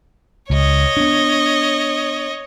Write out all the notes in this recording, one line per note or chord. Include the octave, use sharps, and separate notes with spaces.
C#2 C#5 D#5
B3 D4